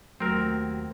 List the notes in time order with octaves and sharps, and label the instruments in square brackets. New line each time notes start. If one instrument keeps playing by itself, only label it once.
[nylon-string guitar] D#2 F#3 [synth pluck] A3 [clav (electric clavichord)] C4 A#4